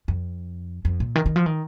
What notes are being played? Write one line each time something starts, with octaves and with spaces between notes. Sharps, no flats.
F2
F2
A#2
D#3
D#3
F3
D#3